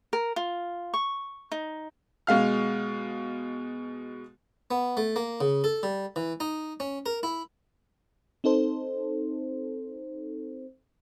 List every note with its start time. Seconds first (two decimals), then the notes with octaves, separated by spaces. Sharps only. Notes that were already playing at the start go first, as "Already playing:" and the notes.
0.13 A#4
0.36 F4
0.94 C#6
1.52 D#4
2.27 B2 G#3 F5 F6
4.71 B3
4.97 A3
5.16 A#3
5.41 C#3
5.64 A4
5.83 G3
6.16 E3
6.40 D#4
6.80 C#4
7.06 A#4
7.23 E4
8.44 C4 D#4 A4 C5